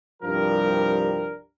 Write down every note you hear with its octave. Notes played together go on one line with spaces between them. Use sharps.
C2 G2 F3 G3 A#4